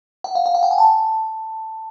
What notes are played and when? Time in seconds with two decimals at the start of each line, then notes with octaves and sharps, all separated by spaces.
0.24 F#5
0.35 F5
0.46 F5
0.55 F#5
0.63 G5
0.71 G#5
0.78 A5